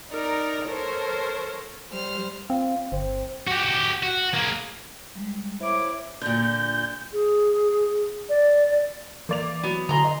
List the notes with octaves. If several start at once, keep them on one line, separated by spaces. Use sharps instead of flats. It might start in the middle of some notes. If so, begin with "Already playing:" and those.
D#4 A#4 D5 A#5
A4 A#4 C5 C#5
G3 C5 F6
C4 F4
G1 C4
F#4 G4
F#4
A#3 G#4
G3 G#3
E4 C5 C#5 D6
A#2 D3 G6
G#4
D5
E3 A#3 D5 F7
F#3 B3
D3 E3 F#3 G#5 A#5 C6
D#5